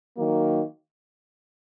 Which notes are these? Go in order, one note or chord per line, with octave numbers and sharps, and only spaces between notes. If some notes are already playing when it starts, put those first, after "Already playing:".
D#3 F#3 A#3